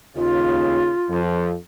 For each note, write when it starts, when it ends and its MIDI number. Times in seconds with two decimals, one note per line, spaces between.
0.16 0.92 39
0.16 0.92 49
0.16 1.19 65
1.09 1.54 41